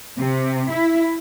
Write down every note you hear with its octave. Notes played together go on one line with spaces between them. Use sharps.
C3
E4